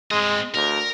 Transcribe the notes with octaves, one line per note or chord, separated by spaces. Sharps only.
G#3 C4 D#5
D2 A#4